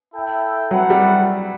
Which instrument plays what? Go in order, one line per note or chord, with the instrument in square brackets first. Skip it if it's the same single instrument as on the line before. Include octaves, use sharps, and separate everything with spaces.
[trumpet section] E4 A4 E5 G5
[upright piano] F#3 [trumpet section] A3 E4 B4 F#5
[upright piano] G3